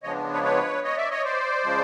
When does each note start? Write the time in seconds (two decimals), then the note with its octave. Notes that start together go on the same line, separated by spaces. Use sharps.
0.03 C#3 F3 G#3 B3 D4 C#5 D#5
0.33 B4 C#5
0.43 B4 C#5
0.84 C#5 D#5
0.97 D5 E5
1.10 C#5 D#5
1.24 C5 D5
1.65 C#3 F3 G#3